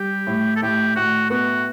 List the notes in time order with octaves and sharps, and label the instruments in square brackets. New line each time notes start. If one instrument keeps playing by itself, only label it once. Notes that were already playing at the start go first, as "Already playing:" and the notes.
Already playing: [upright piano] G3 [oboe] G4
[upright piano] A2
[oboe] A4
[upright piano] A2 [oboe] G4
[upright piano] A2 [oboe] F#4
[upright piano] B3 [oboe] F#4